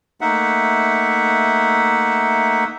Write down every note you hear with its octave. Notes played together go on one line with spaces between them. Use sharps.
A3 A#3 D#4 E5 F#5